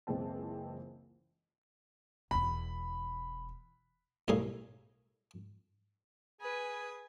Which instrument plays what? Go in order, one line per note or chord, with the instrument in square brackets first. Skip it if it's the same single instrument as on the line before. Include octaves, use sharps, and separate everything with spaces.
[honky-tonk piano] F#1 C#2 E3 G#3 C4 A5
[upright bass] E1 E2 [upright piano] B5
[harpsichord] B1 A2 G3 G#4 A#4 F5
[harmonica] G#4 [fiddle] B4 [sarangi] G#5